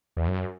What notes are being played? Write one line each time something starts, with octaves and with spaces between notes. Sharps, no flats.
E2
F#2